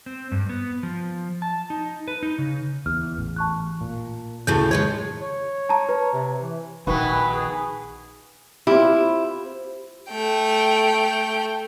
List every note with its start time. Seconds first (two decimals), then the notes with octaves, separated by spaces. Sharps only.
0.06 C4
0.32 G2
0.49 B3
0.83 F3
1.42 A5
1.70 D#4
2.08 B4
2.23 D#4
2.38 C#3
2.86 E2 F6
3.18 A1
3.36 A5 C#6 F#6
3.81 A#2
4.47 D2 A2 C#3 A5 G6
4.71 D#3 G#3 C#5 G#6
5.21 C#5
5.69 A5 A#5
5.89 B4
6.13 C3
6.40 E3
6.87 A#1 B2 D#3 B3 B4 G#5
7.32 G#4
8.67 C4 E4 F4 G4
10.10 A3 G5